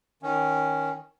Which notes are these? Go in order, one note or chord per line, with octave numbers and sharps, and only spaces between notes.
D#3 C#4